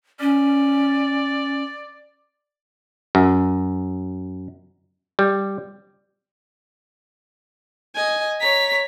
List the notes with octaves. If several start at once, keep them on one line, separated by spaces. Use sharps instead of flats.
C#4 D5
F#2
G3
D#5 G#5
C#5 A#5 B6